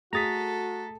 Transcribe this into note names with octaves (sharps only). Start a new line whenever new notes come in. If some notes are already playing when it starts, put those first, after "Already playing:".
A3 F#4 G#4 A4 A#5 D#6 A6 B6